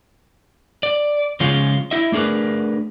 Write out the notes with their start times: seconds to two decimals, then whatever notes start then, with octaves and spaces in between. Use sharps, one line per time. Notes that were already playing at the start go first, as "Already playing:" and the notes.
0.83 D5
1.40 C#3 F3 G#3 C#4 F4
1.91 E4 D#5 E5
2.12 A3 D4 G#4 A#4 B4